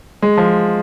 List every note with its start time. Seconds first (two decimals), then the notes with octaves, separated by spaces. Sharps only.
0.22 G#3
0.37 F3